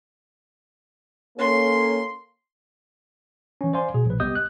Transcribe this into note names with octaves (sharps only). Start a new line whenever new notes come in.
A#3 C#4 A4 C6
E3 C#4
C5 D5 F5 G#5 C6
B2 G#4
A#1 B4
C2 B3 G4 D#5 D#6 G6
F#6